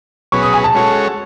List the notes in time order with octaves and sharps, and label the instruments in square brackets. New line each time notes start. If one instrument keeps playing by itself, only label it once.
[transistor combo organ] B2 F#3 C#4 G#4 B4 [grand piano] C#6
[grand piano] D#6
G#5
A5
[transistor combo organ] G#3 C#4 F#4 A4 C#5